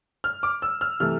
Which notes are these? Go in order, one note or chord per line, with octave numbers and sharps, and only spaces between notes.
F6
D6
E6
F6
C3 E3 A3 F6